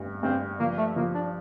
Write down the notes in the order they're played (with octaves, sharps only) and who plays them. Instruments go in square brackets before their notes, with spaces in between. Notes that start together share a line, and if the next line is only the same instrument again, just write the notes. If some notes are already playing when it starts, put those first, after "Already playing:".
Already playing: [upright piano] G2
[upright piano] G2 [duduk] C4
[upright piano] F3 [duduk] A#3
[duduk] A3
[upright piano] F3 [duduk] A#3
[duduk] D4